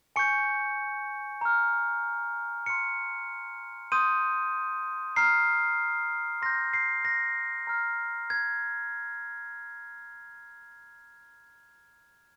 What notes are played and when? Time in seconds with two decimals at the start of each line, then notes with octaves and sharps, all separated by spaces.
0.16 G#5 C#6 G6 C#7
1.41 A#5 F6
2.66 C6 F6 C#7
3.92 C6 D#6 G6 D#7
5.16 A#5 F6 C7
6.42 C6 G6 A#6
6.73 C7
7.05 A#6
7.67 A#5 F6
8.30 G#6